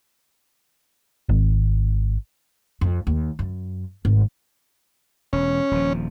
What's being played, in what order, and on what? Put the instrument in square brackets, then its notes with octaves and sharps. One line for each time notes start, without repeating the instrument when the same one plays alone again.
[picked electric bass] G#1
[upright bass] F2
D#2
F#2
G#1
[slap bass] E1 [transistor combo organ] C#4
[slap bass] D#1 F3